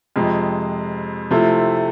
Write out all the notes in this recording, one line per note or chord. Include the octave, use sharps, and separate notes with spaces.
F2 C3 G#3
C3 F3 A3 E4